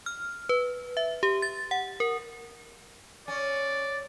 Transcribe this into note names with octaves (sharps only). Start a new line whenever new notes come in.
F6
B4
E5
G4
A6
F#5
A#4
C#4 D5